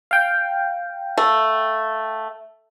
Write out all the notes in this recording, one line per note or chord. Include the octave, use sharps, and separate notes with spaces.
F5 G5
A3